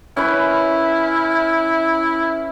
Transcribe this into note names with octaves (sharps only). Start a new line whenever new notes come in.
C#4 E4 B4